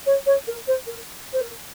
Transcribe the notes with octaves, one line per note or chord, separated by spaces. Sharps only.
C#5
C#5
A#4
C5
A#4
C5
A#4